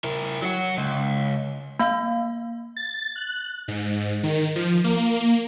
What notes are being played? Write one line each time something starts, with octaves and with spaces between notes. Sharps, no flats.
E4 A#4
F#3 F#4
C#2
A#3 F5
A6
F#6
G#2
D#3
F3
A#3